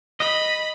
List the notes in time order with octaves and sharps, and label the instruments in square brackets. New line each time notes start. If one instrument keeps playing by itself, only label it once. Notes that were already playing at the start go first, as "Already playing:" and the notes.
[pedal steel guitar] D#5 [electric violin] B5